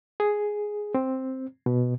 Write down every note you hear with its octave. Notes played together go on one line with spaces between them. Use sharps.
G#4
C4
B2